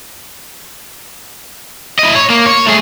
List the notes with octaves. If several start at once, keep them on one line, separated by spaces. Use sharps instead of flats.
E4 D#5
C#5
A#3
C#5
A3 G#4